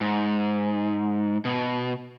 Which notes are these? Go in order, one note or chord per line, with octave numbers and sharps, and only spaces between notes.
G#2
B2